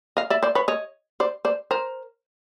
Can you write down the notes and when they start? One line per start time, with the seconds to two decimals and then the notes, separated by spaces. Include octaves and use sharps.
0.17 D#5 F5
0.30 D5 E5
0.43 C5 D5
0.55 B4 C#5
0.68 C#5 D#5
1.20 C5 D5
1.45 C5 D5
1.71 A#4 C5